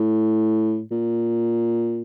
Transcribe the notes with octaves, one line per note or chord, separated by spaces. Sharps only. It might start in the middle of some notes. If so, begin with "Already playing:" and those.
Already playing: A2
A#2